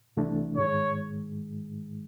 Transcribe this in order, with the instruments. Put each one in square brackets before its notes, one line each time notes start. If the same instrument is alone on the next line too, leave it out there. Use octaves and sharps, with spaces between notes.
[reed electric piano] C2 C3 E3 A3 D4
[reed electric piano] G#2 D#3 G#3 [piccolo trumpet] C#5